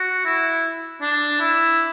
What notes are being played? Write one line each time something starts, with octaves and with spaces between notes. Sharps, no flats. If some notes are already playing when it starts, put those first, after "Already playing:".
Already playing: F#4
E4
D4
E4